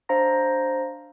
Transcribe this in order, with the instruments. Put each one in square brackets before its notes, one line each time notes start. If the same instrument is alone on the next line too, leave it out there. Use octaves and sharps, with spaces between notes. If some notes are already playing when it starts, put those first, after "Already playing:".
[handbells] D4 C5 F5 A#5 A#6